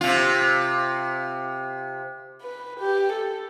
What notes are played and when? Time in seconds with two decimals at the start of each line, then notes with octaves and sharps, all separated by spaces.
0.01 C3 F4
2.41 B4
2.79 G4
3.12 A4